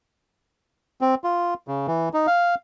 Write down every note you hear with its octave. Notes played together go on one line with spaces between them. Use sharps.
C4
F4
C#3
E3
D#4
F5